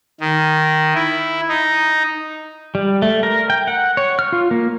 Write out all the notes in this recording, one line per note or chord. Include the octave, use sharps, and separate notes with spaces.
D#3
E4
D#4
G3
A3
A#4
G5
F#5
C#5
F6
F4
A#3